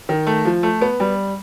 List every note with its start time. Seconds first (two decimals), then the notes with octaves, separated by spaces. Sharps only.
0.09 D#3
0.27 A3
0.45 F3
0.63 A3
0.81 B3
1.00 G3